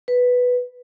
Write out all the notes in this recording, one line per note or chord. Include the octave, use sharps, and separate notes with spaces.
B4